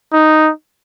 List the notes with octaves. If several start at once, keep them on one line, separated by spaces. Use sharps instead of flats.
D#4